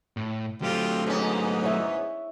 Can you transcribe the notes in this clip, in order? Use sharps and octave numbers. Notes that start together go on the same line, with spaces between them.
A2
F#3 A3 C4 F4 G4
G#2 B3 C#4 D#4
E4 C#5